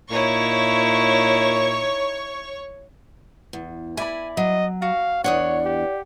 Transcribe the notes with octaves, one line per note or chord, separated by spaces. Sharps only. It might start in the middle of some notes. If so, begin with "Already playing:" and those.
A#2 D#4 E4 C#5 C#6
E2
E4 D5 G#5 B5
F#3 D#5
F#4 F5
E2 G#2 D4 C#5 D5 F#5 D#6
G4